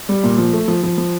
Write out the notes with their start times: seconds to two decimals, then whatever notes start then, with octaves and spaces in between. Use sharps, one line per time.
0.09 G3
0.24 A#2
0.38 F3
0.53 A3
0.68 F3
0.83 F3
0.98 F3